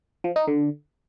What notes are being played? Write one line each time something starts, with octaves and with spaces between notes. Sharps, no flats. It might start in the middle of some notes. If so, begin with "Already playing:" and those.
F3
D#4
D3